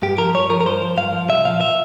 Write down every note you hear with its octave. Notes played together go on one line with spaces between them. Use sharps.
G2 G4
F3 A#4
G2 C#5
F3 A#4
A#4
G2 C5
F3
G2 F5
F3
C2 E5
A#2 F3 F5
E5